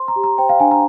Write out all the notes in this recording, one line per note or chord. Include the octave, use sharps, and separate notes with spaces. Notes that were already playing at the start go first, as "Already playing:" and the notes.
Already playing: C5 C6
A#5
G4
A#5
C5 G5
F5
D4 G#5
A#5